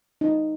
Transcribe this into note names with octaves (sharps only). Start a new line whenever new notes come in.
D#4